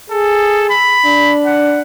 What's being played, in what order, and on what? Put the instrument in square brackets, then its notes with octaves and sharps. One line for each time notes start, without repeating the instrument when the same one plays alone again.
[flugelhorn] G#4 [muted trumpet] A4
[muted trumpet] B5
[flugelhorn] D4
[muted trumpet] F#5